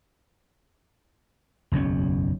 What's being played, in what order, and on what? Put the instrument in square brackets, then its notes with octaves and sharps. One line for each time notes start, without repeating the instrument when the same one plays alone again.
[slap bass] F#1 B1 E2 C#4